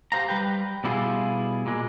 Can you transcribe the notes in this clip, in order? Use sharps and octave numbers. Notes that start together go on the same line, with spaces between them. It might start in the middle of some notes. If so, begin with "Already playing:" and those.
G4 A4 C5 F5 A#5
G3 B4 G5
B2 G3 E4 F4 G#4
A#2 G#3